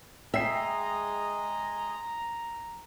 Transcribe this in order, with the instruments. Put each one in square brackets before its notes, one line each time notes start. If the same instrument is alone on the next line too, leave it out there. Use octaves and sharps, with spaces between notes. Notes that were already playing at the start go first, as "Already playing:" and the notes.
[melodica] G#3 G#4 D#5 [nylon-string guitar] E5 [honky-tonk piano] G5 C7 [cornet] A#5